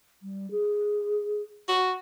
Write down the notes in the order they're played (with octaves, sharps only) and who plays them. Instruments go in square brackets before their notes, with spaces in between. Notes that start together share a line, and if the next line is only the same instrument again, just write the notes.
[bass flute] G3
G#4
[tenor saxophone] F#4